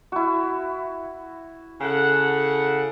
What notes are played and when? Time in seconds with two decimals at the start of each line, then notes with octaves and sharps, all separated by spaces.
0.12 E4 F#4
1.81 C#3 A4 F#5